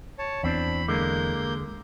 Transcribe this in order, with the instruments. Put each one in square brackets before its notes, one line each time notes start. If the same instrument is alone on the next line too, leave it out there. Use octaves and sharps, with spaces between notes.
[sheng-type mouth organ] C#5 A5
[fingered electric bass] E2 [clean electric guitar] C4 D4 [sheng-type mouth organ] B5
[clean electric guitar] D3 G#3 [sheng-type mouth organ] A#3 G6